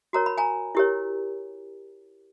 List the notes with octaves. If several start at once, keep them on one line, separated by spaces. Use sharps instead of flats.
F#4 A#4 C#5 A#5
B5
G#5 A#5
E4 G4 A#4 C#5